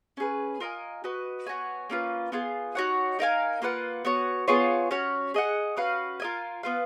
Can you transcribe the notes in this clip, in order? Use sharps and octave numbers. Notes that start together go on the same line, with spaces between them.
C#4 G#4 B4
F4 A#4 D#5 G#5
F#4 B4 D#5
B3 F#4 C#5 G#5
A#3 C#4 F4 B4
B3 F4 G#4
D#4 F#4 C#5 F#5
D#4 A#4 F5 G#5
A#3 F4 B4 F#5
B3 F#4 C#5
B3 F4 G#4 C#5
C#4 F#4 C#5
G#4 D#5 F#5
C#4 F#4 B4 F5
F4 A#4 D#5 G#5
B3 F4 B4 F5